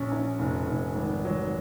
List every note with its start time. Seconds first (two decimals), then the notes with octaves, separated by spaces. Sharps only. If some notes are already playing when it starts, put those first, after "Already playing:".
Already playing: A#1 C#4
0.12 A#1
0.39 F1
0.67 F1
0.95 G#1
1.25 F#3